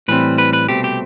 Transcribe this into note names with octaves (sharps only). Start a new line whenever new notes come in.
A2 E3 G3 C4 B4
B4
B4
C2 B2 A3 C4 G4
G4